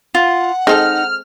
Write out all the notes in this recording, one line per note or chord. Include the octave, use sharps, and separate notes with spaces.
F4 F#5
G#3 C4 D#4 A4 F6